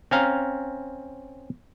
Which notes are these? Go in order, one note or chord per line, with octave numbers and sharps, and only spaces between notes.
C4 C#4 F5 A#5